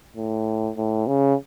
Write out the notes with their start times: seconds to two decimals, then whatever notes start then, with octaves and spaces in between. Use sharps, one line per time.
0.16 A2
0.77 A2
1.07 C#3